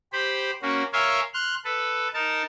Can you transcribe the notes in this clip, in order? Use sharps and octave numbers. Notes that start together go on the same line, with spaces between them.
G4 C5 B5
A#3 C#4 F#4
A#4 C#5 E5 F5 G#5 C6
C6 F6 F#6
A4 B4
D#4 A#4 A5